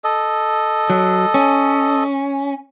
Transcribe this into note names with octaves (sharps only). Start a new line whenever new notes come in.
A4 D#5
F#3
C#4